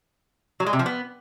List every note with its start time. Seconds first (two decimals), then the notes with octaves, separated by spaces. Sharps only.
0.60 F#3
0.66 G#3
0.73 C3
0.79 F3
0.86 B3